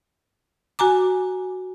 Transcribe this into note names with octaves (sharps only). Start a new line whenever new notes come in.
F#4 G#5 A#5 D6